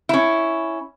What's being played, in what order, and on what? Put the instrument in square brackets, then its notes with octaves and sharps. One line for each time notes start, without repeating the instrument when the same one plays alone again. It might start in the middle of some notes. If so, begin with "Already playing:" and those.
[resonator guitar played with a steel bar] C#4 E4